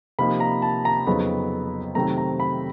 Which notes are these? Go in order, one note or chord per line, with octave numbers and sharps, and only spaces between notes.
C3 F3 A#3 D#4 B5
A#5
A5
A#5
F2 C#3 F#3 B3 D#4 B5
C3 D#3 F#3 A3 C4 A#5
A#5
B5